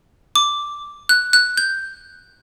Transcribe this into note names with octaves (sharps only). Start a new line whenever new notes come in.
D6
F#6
F#6
G6